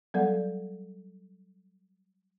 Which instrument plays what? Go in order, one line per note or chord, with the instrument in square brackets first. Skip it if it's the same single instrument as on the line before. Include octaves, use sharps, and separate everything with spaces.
[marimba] F#3 G3 B3 A4 D5 F#5